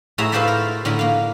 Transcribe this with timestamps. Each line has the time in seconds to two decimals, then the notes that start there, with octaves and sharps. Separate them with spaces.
0.18 A2 F#4 G#4 E5 A#5
0.32 F4 F#4 B4 C5 D5 E5
0.48 A#4
0.85 A2 D3 A#4 A#5 B5
0.99 A#3 F5